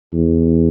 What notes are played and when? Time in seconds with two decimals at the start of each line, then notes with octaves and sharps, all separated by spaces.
0.13 E2